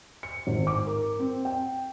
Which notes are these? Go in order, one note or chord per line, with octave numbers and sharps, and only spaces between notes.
C#7
G#1
D6
A#4
C4
G5